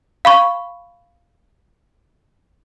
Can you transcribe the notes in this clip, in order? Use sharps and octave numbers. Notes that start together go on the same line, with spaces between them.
F5 B5 C#6